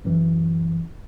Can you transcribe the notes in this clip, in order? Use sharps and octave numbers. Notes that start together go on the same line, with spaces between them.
F#2 E3